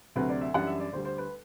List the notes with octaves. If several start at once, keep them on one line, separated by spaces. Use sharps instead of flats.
D2 C3 F#3 C4 B4
D5
E5
F#2 E3 G3 D4 F#5
E5
D5
D2 D3 G3 C5
C5
B4